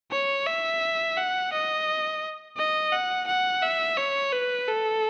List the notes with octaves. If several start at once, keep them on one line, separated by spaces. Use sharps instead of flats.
C#5
E5
F#5
D#5
D#5
F#5
F#5
E5
C#5
B4
A4